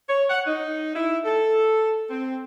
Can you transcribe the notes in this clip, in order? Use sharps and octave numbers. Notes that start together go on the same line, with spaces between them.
C#5
F#5
D#4
E4
A4
C4